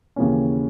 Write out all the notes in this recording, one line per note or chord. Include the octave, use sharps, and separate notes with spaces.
D#2 C#3 E3 A#3 C#4